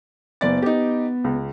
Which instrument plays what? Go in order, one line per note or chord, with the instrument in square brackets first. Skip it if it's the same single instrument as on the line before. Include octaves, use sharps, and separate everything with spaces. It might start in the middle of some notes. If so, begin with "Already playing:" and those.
[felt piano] F#1 D5 A6 [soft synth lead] B3
[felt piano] D#4 G4
C#2